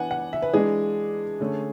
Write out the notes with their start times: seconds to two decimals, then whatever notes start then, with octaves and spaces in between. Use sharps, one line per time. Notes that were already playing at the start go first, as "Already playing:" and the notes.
Already playing: E3 B3 D4 F#5 G#5
0.11 F#5
0.33 E5
0.42 B4
0.54 E3 G#3 D4 G#4
1.40 D3 A3 C#4